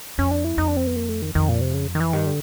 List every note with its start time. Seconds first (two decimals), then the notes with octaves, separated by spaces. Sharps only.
0.18 F2 C#4
0.31 D4
0.44 E4
0.57 F2 D#4
0.68 D4
0.77 C4
0.87 B3
0.96 A#3
1.09 A3
1.22 D#3
1.35 F2 D#3
1.49 A#2
1.61 C3
1.74 C#3
1.95 D#3
2.00 E3
2.13 G2 D#3
2.27 D3